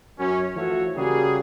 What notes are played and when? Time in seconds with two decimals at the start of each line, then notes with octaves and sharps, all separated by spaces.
0.19 F#2 C#4
0.56 E3 F3 A3 F#4 C#5 E5
0.96 C#3 G3 A#3 F#4 G#4